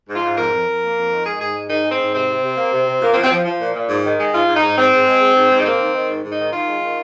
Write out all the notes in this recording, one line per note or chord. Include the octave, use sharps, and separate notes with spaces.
G#2
F4
G#2
F2 A#4
F2
F2
A#3
F2
D#3
G#3 G#4
G#2 G#4
G#3
G#2 D#4
G#3
C4
G#2
C3 C4
C3
C3
A#3
C3
C3
A#2 A#3
C4
F3
C4
F3
F3
A#2
A#2
G#2
D#3
G#3
G#2 F4
G#2
D#4
G#2
G#2 C4
G#2
G#3
G#3
G#2
G#2
D#4
A#3 C4
D#3
D#3
G#2
G#2
D#4
D#3
D#3 F4
G#3
D#3